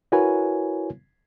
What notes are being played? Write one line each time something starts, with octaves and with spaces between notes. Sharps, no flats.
E4 F#4 A#4 B4 C#5 G#5